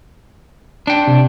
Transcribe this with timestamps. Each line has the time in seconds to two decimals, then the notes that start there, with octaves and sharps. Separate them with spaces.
0.87 D4 G5
1.07 C3